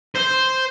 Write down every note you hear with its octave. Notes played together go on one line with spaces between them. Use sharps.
C5